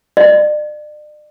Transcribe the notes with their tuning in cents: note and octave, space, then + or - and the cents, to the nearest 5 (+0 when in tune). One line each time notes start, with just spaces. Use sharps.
D5 +40